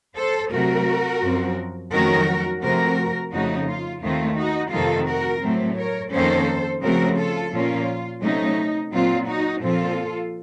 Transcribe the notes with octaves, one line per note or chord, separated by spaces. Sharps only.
A4 C5
C3 F#3 A3 F#4 A#4
F#2 F3 C4
F2 D#3 F#3 A3 C#4 F#4 A#4
C3 F3 A3 C4 F#4 A#4
F2 C#3 A3 D#4 F#4
F4
D#2 D#3 A3 C4 F4
D#4 F#4
F2 C3 D#3 A3 F4 A4
F#4 A#4
A2 F#3 A3 C4
A#4 C#5
F2 D#3 A#3 C#4 A4 C5
C#3 F3 A3 C4 F#4 A#4
F4 A4
A#2 F3 A#3 C#4 F4
C3 F#3 A3 C#4 D#4
A#2 F#3 C4 F4
D#4 F#4
A#2 F3 C4 F4 A4